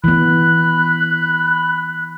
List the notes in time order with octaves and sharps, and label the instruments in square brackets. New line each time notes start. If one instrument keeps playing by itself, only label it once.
[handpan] E3 B3 [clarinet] B5 [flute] F#6